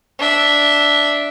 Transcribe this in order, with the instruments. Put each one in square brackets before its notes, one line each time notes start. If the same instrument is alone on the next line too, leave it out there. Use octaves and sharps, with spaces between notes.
[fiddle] D4 E5